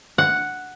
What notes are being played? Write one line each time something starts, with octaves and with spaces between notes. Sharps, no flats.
F#5